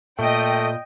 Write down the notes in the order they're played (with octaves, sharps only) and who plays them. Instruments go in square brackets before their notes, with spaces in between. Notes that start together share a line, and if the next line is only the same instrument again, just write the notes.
[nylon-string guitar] A#2 [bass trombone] A3 [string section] D#5 G5